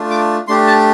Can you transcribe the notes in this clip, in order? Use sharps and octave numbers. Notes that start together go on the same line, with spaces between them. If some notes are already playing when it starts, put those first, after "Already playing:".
Already playing: A3 D4 F4
D6
A3 D4 G4 C6
A5